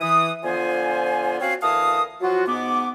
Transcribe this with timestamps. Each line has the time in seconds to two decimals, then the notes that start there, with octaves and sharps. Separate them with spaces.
0.01 E3 D#6
0.43 D3 F3 B3 F4 C5 G#5
1.40 C4 C#4 F#4 C#5 F5
1.62 D2 E3 A#4 F5 A5 D#6
2.21 F3 F#3 F4 F#4
2.47 G#2 B3 D6